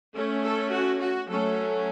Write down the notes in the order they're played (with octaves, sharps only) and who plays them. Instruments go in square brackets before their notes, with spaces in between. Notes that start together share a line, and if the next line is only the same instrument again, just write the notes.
[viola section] A3 C#4
A4
F#4
F#4
F#3 A3 C#4 A4